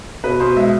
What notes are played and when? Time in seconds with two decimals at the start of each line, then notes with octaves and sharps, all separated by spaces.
0.24 B2 B4
0.40 B2 C5
0.56 G#3 E5